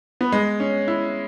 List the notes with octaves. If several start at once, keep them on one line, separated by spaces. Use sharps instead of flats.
B3
G#3
C#4
E4